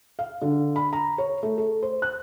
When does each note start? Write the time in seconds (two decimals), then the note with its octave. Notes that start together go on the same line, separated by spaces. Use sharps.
0.19 F5
0.42 D3
0.76 B5
0.93 A#5
1.18 C#5
1.43 A3
1.58 A4
1.83 C5
2.02 F#6